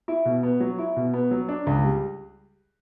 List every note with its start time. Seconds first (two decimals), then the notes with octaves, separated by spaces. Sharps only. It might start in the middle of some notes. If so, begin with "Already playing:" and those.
0.08 E4
0.26 B2
0.43 B3
0.60 F#3
0.79 E4
0.97 B2
1.14 B3
1.31 F#3
1.49 D4
1.67 C#2
1.84 G3